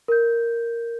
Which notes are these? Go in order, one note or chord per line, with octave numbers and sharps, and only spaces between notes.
A#4 G6